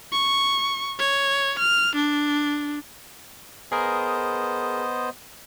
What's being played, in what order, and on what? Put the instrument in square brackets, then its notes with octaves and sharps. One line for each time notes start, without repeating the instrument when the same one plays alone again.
[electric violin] C#6
C#5
F6
D4
[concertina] B3 C5 D#5 [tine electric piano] G#4 A#4